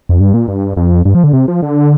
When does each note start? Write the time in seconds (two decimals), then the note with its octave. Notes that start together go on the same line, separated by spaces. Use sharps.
0.09 F2
0.20 G2
0.34 A#2
0.48 G2
0.77 F2
1.05 G2
1.15 F3
1.24 D3
1.33 C3
1.48 F3
1.63 D3